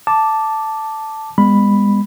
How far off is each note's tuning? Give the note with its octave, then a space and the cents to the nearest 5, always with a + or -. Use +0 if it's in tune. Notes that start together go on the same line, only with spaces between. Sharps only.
A5 +0 D6 +0
G#3 -40 B3 +0 B5 +0